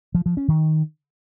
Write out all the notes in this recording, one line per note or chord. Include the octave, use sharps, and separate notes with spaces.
F3
F3
C#4
D#3